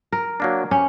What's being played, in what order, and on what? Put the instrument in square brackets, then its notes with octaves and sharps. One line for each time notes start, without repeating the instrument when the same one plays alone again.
[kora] A#4
[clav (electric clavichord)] F#3 A#3 D4
[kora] C#4 [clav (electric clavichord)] G4